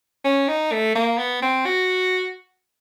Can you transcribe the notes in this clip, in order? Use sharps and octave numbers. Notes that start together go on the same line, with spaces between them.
C#4
D#4
A3
A#3
B3
C4
F#4